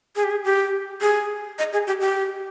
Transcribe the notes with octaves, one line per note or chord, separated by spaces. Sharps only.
G#4
G4
G#4
G4
G#4
D#5
G#4
G4
G4